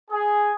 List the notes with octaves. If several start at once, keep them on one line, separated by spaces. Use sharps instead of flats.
G#4